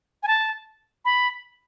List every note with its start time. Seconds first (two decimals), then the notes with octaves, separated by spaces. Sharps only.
0.23 G#5
0.27 A5
1.05 B5